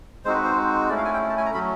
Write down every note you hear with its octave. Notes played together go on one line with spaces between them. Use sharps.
G#3 C4 D#4 F#4 C5
B4
C5
A3 C#4 E4 D5
F5
G#5
G5
A5
G#5
A#5
F#3 A3 C#4 B5